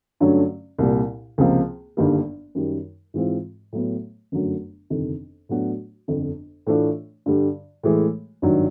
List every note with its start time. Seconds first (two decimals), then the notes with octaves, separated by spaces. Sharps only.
0.20 G2 D3 F#3 A3 C#4
0.79 C2 A#2 G3
1.38 C#2 C3 F3 A#3
1.97 G1 G2 D#3 G3 A#3
2.55 F#2 D#3 G3
3.14 G#2 E3 G#3 C4 F4
3.72 A2 F#3 B3
4.32 G1 F#2 D3 F#3 A3
4.90 G1 F2 C3 D#3
5.49 A2 F#3 B3 D4 F#4
6.08 G1 F2 D3
6.66 A2 E3 A3 D4 F4
7.26 G2 D3 G3
7.83 A2 E3 G#3
8.42 G#1 G2 D#3 F#3